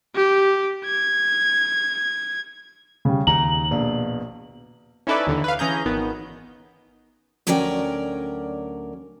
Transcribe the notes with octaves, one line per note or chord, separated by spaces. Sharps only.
G4
G#6
C#3 G3
D#2 C#3 A#5 F#7
A#1 B2
C#4 D#4 E4 A4 B4 D5
D#2 D3 E3
B4 F5
E3 C#4 G#4 A#5 G6
G#1 D#3 B3
D2 F#3 C#4 A#4 D5 G5